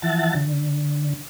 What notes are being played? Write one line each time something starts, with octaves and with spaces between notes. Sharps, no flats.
E3 F3 E5 F#5 A5 A6
D3